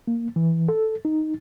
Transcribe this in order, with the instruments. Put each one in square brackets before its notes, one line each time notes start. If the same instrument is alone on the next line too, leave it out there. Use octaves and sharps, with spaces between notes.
[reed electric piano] A#3
E3
A4
D#4